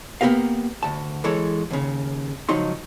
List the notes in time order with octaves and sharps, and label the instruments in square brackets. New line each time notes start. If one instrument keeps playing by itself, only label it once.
[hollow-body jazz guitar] A#3 B3 C#4 G4 A#4 F5
D2 A5
E3 G#3 A4 C#5
D#2 C#3
C#2 F3 F#3 D#4 C6